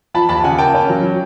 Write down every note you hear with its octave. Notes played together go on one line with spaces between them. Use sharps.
F3 A5 B5
D#2 A5 B5
C#3 F#5 G#5
A#3 G5 A5
C#4
F#3
F#3